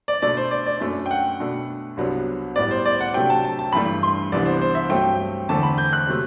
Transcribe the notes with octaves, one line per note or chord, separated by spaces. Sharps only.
D5
B2 A3 D4 D5
C5
D5
D5
F#2 F#3 A3 D4
G5
F#5
B2 A3 D4
C2 C3 F#3 B3 D4
A2 G3 B3 D5
C5
D5
F#5
C3 F#3 A3 D4 G5
A5
A5
A5
G2 E3 A3 D4 B5
C6
C2 C3 E3 B3 D4 D5
C5
C5
E5
G2 F#3 A3 C4 G5
E2 D3 A3 C4 A5
B5
G6
F#6
C3 F#3 A3